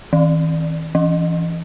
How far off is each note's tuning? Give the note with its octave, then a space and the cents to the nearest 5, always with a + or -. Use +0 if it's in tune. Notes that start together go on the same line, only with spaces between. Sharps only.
E3 -45
E3 +20